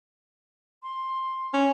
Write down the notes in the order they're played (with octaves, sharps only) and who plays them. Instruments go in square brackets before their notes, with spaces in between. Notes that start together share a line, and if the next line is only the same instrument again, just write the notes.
[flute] C6
[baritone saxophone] C#4